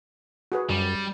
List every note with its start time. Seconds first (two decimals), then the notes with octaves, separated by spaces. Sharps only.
0.52 F#4 G#4 B4
0.69 F#2 G3